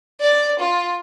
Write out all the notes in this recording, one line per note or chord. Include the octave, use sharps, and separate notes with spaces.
D5
F4